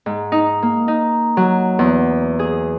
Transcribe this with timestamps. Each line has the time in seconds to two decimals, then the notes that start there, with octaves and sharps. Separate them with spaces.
0.06 G#2
0.32 D#4
0.62 A#3
0.88 D#4
1.37 F#3
1.79 E2
2.39 G#4